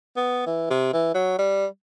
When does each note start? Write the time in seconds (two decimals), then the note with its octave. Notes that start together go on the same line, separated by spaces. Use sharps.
0.17 B3
0.46 E3
0.70 C3
0.93 E3
1.15 F#3
1.38 G3